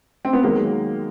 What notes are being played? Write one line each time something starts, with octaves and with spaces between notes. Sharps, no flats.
C4
B3
D#2 D#3 F#3 G#3 A#3